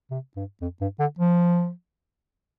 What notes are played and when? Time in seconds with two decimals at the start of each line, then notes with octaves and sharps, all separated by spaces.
0.11 C3
0.36 G2
0.61 F2
0.81 G2
0.99 D3
1.19 F3